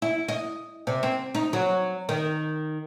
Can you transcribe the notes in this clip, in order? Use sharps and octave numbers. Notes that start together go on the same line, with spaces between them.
E4
D#5
C3
C4
D#4
F#3
D#3